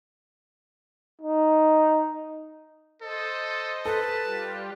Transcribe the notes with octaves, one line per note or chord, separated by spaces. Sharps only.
D#4
A4 C5 D#5
A4 B4 A5
G3 F4 G4